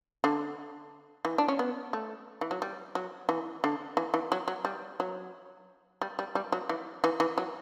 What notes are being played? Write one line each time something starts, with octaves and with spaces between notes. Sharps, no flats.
D3
E3
D4
C#4
B3
A3
E3
F#3
G3
F#3
E3
D3
E3
E3
F#3
F#3
G3
F#3
G3
G3
G3
F#3
E3
E3
E3
F#3